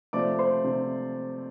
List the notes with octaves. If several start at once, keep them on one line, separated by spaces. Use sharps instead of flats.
C3 F3 A3 D5 D6
C5 C6
C3